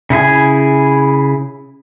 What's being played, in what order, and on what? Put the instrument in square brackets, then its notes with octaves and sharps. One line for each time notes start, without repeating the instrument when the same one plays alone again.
[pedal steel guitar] C#3 E4 G#4 G#5